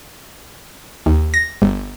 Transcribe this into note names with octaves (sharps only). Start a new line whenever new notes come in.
D#2
A#6
G1